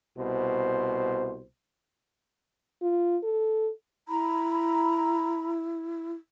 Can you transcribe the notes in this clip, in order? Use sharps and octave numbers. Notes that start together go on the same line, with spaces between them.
C2 B2 C5
F4
A4
E4 A#5 B5